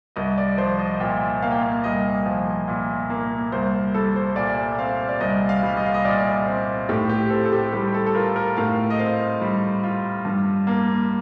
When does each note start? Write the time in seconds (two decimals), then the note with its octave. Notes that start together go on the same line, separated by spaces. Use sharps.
0.16 C2 D#5
0.38 D5
0.57 F3 C5
0.79 D#5
1.00 A#2 G5
1.42 A#3 F5
1.52 G5
1.63 F5
1.84 C2 D#5
2.26 F3
2.68 A#2
3.10 A#3
3.52 C2 C5
3.94 G3 A4
4.16 C5
4.36 A#2 D5
4.79 C4 F5
5.09 D5
5.20 C2 D#5
5.49 F5
5.63 G3
5.77 D#5
5.86 F5
5.94 D#5
6.05 A#2 D5
6.47 C4
6.89 A2 G4
7.09 G4
7.30 C4 A4
7.45 A4
7.53 G4
7.73 G3 G4
7.94 A4
8.06 A4
8.15 F4 A#4
8.36 A#4
8.56 A2 F5
8.90 D#5
8.99 C4 F5
9.41 G3
9.83 F4
10.25 G2
10.67 A#3